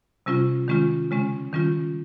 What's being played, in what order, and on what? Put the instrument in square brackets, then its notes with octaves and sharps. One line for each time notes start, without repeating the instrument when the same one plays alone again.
[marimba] C3 G3 C#4 F4
D#3 G#3 C#4 F4
C#3 G#3 C#4
D#3 G3 C#4 F4